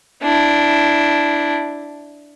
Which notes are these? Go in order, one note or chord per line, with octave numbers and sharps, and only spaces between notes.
D4 E4